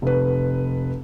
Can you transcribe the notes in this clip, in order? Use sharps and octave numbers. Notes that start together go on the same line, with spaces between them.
F1 B4